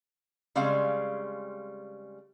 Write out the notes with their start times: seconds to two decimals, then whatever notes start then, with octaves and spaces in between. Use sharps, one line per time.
0.55 C#3 G3 G#3 C4 F5